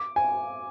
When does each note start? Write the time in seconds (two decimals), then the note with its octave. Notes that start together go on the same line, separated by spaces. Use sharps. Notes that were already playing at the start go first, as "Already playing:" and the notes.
Already playing: D6
0.16 G#5